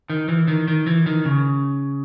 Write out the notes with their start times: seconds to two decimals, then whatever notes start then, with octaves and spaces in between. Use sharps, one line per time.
0.10 D#3
0.28 E3
0.48 D#3
0.68 D#3
0.87 E3
1.06 D#3
1.25 C#3